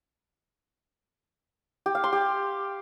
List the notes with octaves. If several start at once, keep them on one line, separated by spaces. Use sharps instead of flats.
G4
F5
C6
G4